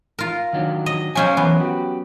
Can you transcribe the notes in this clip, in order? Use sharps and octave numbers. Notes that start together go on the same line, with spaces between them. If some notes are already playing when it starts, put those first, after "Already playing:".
F4 A#4
D#3 F#3 D4
D#5
F#3 C#4 C5 D#5 F5 G#5
E3 B3 A#4
F#4 G4